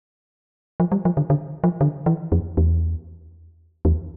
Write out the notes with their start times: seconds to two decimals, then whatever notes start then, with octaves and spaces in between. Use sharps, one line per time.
0.80 F3
0.92 G3
1.05 F3
1.17 D3
1.30 D3
1.64 F3
1.81 D3
2.06 E3
2.32 F2
2.57 E2
3.85 E2